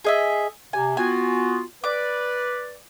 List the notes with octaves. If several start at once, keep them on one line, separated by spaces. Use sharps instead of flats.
G#4 D#5 E5
C3 G#5
B3 F4 F#4 G#5
B4 D5 D6